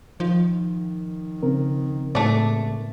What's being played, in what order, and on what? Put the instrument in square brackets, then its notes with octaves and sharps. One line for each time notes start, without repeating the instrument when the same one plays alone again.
[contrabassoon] D#3 [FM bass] F3
[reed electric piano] C#3 C4 A#4
[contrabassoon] E1 [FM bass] A2 [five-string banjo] A3 D5